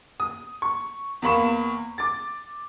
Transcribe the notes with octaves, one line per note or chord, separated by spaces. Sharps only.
D#6
C#6
E2 A#3 B5 C#6 E7
D6 A6